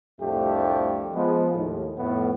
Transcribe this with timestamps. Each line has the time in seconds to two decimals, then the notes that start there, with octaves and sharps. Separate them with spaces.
0.21 C2 F2 A2 A3 D4 G4
1.13 F3 G#3 B3
1.54 D#2 A2
1.98 F2 A2 B3